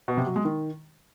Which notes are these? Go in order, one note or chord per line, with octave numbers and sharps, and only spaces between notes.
B2
C3
F#3
G#3
D#3